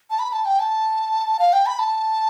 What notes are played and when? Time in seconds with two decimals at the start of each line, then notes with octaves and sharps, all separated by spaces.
0.10 A5
0.19 B5
0.33 A5
0.45 G5
0.59 A5
1.39 F5
1.53 G5
1.66 B5
1.79 A5